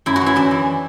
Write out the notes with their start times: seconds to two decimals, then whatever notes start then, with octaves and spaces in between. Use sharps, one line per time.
0.06 F#2 E4
0.16 F#4
0.21 E3
0.26 E4
0.36 F#2 D4
0.51 E3